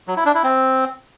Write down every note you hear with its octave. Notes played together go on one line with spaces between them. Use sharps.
F#3
E4
D4
E4
C4